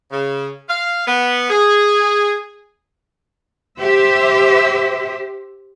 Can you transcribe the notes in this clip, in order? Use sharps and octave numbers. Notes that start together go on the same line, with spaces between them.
C#3
F5
B3
G#4
G4 C5 E5